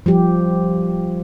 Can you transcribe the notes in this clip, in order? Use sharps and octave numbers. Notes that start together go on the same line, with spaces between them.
F3 G3 G4